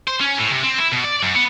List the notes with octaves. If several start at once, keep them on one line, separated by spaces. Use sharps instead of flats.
C5
C#4
A2
C3
C4
E4
B2
D5
F#2
B3